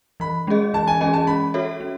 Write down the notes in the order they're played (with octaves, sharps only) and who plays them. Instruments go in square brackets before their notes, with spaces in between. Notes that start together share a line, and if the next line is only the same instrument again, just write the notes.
[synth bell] E3 [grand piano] B5
[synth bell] G#3 C#4 G#4 D#5
[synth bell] E3 [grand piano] A5
[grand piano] G#5
[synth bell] G#3 C#4 G#4 D#5 [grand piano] G#5
[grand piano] A5
[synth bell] C#4 [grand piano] B5
[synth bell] F#4 A4 C#5 E5
C#4